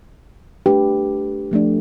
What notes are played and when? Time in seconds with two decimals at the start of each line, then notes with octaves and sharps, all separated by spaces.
0.66 A3 D4 G4 B4
1.51 F3 A3 D4